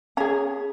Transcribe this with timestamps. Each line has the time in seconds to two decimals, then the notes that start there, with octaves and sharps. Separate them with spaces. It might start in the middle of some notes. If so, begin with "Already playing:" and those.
0.17 C#4 G#4 A#5